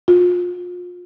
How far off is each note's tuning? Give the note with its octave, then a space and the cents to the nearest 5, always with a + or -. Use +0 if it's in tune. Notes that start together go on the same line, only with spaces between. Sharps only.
F4 +30